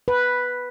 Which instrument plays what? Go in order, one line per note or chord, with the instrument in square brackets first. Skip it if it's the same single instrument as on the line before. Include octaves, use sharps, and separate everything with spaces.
[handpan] B4